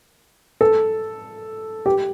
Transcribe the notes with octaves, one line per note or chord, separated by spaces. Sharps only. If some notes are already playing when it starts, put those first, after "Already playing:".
A4
G4